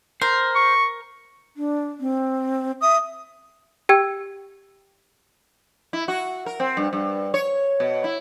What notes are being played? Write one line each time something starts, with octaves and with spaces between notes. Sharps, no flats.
A#4 C5
C#6
D4
C4
E5 D#6
G4 G5 E6 G#6
E4
F#4
A#4
C4
G2
G2
C#5
B2
E4